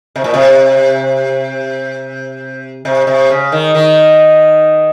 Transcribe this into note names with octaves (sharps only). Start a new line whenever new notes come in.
C3
A#2
C3
C3
C3
C#3
D#3
D#3